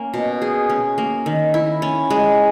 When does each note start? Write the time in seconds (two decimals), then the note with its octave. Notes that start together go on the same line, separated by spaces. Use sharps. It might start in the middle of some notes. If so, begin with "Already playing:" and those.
Already playing: A#3 C#4
0.14 B2
0.42 G#4
0.70 C#4
0.98 A#3
1.26 D#3
1.54 E4
1.82 C#4
2.10 G#3